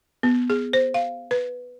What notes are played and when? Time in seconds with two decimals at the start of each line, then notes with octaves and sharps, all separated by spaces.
0.23 B3
0.50 G#4
0.73 C5
0.94 F5
1.31 B4